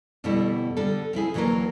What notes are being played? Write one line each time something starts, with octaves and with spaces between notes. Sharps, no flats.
F2 B2 D3 G3 A3 E4
D3 G3 A4
F3 C4 E4 G#4
D2 E3 F#3 G3 A#3 A#4